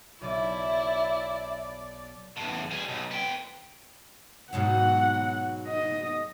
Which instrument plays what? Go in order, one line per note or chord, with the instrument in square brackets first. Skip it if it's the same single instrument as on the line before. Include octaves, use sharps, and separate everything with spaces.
[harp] B1 [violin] E4 [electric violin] D5 [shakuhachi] E5
[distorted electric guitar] E2 A2
G3 G#4
B1
B3 G5
[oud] G#2 B2 F#3 [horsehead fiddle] F#5
[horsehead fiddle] D#5